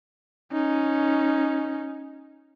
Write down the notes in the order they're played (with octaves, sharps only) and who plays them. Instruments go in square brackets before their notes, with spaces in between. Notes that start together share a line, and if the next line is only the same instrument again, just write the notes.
[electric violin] C#4 D#4